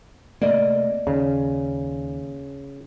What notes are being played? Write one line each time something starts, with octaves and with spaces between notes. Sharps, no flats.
C3 A3 A#3 D5 D#5
D#2 C#3